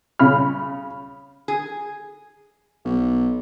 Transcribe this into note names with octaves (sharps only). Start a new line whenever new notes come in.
C#3 B5 F6
G#4
B1